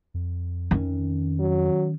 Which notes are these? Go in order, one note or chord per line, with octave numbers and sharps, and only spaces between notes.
F2
D#3 C#4
F#3